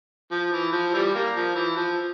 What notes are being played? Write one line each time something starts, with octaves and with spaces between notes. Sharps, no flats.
F3
E3
F3
E3 G3
G3 A#3
F3
E3
F3